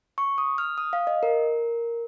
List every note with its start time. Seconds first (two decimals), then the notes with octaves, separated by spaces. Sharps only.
0.18 C#6
0.38 D#6
0.58 F6
0.78 D#6
0.93 F5
1.07 D#5
1.23 A#4